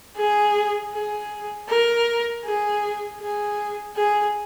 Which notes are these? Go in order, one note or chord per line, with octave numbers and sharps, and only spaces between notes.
G#4
G#4
A#4
G#4
G#4
G#4